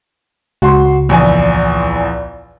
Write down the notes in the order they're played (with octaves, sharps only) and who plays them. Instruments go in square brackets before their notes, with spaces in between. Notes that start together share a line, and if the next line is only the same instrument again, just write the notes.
[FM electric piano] C#2 [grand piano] F#4 C6
[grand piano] A#1 E2 G#5